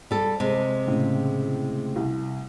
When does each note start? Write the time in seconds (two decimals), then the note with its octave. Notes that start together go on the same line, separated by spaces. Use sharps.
0.11 G3 A4
0.40 C3 G#3
0.87 A2 C#3
1.96 C2